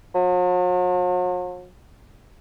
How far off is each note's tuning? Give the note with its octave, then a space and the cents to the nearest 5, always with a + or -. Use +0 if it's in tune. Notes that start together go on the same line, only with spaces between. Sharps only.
F#3 -45